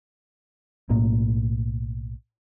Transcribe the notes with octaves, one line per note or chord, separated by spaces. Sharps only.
B1 A2 A#3